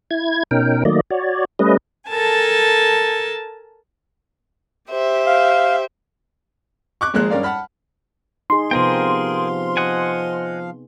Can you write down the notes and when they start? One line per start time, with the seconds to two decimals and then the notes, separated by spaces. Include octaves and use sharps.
0.11 E4 G#6
0.51 B2 C#4 D#4 A#4 G5
0.85 D#3 F#3 A3 A#3 D5 D#5
1.10 F#4 C#5 D5
1.59 G3 A3 C#4 B4 D#5
2.07 A4 A#4 G#5 A5
4.90 G4 C5 E5
5.27 F5
7.01 C#6 D6 F#6
7.14 G#1 F3 G#3 A#3 G#4 F#6
7.30 G2 C#4 A#4 D5 F5
7.43 F#5 A5 B5 F6
8.50 D#4 G#4 C6
8.71 C3 F3 B3 G#4 A#4 F5 G5
9.77 D#5 F#5 G#5